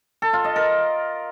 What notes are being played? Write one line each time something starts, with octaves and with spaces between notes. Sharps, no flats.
A4
F4
D#5
A#4